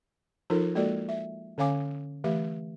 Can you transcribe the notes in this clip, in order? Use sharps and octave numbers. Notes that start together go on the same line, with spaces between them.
F3 D#4 F4 A4 A#4
G#3 A#3 F#4 A4 D5
E5
D3 C#4 C#5 F5 G#5 D6
E3 A3 G4 E5